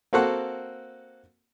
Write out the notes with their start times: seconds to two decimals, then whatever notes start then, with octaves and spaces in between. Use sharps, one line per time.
0.13 A#3 C4 F#4 A4 F#5